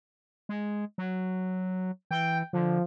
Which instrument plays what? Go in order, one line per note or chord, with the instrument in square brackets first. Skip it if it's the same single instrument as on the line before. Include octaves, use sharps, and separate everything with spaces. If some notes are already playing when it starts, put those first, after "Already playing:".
[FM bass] G#3
F#3
[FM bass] E3 [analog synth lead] G5
[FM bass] D3 [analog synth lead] F3